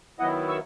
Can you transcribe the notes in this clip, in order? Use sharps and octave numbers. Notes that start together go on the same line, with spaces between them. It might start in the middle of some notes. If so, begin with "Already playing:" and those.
D#3 F#3 B3 E4 D#5 F#5
C#6 E6